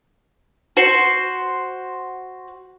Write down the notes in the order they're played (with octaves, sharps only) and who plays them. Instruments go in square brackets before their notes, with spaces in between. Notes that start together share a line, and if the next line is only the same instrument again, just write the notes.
[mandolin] F#4 C5